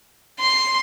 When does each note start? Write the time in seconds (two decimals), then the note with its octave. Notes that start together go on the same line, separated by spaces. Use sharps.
0.40 C6